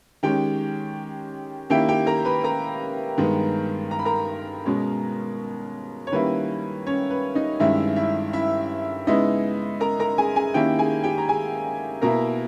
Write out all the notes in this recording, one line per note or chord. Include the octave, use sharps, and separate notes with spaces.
D#3 G#3 C#4 G4 G5
D#3 A#3 C#4 E4 G4 G5
G4 G5
A#4 A#5
B4 B5
A#4 A#5
G2 D#3 G#3 B3
A#5
B5
A#4 A#5
B2 G#3 C#4
C#5
D#3 G3 A#3 C#4 E4 B4
C#4 C#5
B4
D#4 D#5
G2 D#3 G#3 C#4 E4 E5
E4 E5
E4 E5
C#3 G#3 B3 D#4 E4 D#5
A#4 A#5
A#4 A#5
G#4 G#5
G#4 G#5
D#3 A#3 C#4 E4 G4 G5
G#4 G#5
G4 G5
A#5
G#4 G#5
B2 A#3 E4 A#4 A#5